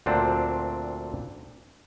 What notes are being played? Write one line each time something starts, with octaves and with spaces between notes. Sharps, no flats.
D2 A#2 C4 D4